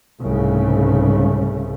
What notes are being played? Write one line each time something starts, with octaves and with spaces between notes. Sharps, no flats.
C2 G#2 C#3 A3